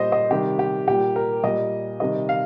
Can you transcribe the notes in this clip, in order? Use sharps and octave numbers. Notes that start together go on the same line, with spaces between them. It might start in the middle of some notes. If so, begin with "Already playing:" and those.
Already playing: A#2 G3 C5 D#5
D#5
C3 D#3 G3 G4
G4
A#2 G3 G4
A#4
A#2 G3 D#5
C3 D#3 G3 D#5
F5